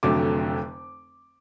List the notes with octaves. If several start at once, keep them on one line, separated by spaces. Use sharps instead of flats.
F1 F2 D3 F#3 A3 D6